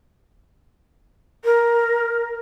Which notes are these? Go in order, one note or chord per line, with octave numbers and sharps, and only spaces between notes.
A#4